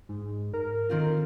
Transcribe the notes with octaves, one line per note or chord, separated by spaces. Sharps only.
G#2
A#4
D#3 C4 F4